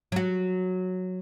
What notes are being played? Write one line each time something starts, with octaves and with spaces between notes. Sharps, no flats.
F#3 F#4